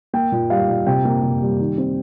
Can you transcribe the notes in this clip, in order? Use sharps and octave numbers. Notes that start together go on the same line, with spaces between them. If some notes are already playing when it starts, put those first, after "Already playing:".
A#3 G5
A#2
G3 F5
A#2
C3 G5
A#3
C3
G3
D#3
C4